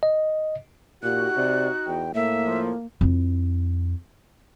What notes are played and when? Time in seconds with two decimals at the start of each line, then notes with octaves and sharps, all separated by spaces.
0.03 D#5
1.03 A#2 D#4 F#4 G4 F#6
1.36 C3 D5
1.86 E2 G5
2.15 A2 A#3 E5
2.45 F3
3.01 F2 E4